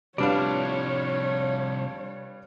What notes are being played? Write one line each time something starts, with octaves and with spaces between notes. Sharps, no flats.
C2 F3 G3 D4 B4 C#5 D5 F5